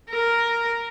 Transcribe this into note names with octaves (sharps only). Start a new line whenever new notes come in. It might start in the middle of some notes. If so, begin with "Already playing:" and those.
A#4